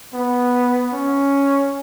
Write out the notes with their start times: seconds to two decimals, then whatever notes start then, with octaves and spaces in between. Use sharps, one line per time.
0.14 B3
0.93 C#4